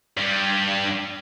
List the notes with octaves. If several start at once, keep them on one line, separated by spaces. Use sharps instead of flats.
G2 G3